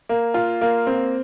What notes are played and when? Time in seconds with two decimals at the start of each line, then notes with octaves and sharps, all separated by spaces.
0.09 A#3
0.34 F4
0.61 A#3
0.87 C4